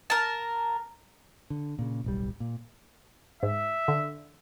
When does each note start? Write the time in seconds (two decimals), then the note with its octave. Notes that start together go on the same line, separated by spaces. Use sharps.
0.10 A#4 A5
1.50 D3
1.79 A#2 C#3
2.04 D1 B1 G3
2.40 A#2
3.43 G#2 E5
3.88 D3